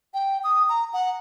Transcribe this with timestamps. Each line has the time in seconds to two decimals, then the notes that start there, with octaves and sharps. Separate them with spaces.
0.14 G5
0.44 D#6
0.69 A#5
0.93 F#5